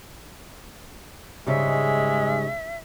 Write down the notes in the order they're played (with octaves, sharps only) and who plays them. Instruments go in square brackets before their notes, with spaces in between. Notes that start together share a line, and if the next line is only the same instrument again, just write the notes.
[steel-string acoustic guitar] G#2 C#3 G3 [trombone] G#3 [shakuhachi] E5